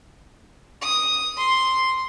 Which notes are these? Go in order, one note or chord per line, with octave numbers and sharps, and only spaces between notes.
D#6
C6